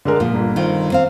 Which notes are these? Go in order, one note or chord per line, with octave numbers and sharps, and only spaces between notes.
D3 G#3 A#4
A#2 F3
G1
D#3 C4 F4
C4 F5